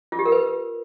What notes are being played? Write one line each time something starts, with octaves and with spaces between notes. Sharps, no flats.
F4
G4
A#4
B4